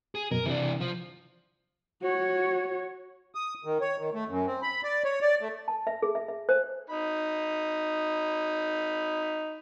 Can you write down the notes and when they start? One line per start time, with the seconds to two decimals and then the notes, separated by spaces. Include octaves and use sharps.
0.15 G#4
0.31 F#2 B2 A#4
0.46 C3 E3 D4
0.80 F3
2.02 F#4 C#5
3.35 D#6
3.64 D#3
3.81 C#5
3.98 D#3
4.14 A3
4.28 F#2
4.46 C4
4.62 B5
4.84 D5
5.04 C#5
5.22 D5
5.41 A3
5.68 A5
5.87 E5
6.02 G#4
6.15 E5
6.28 E5
6.49 C5
6.90 D#4 B5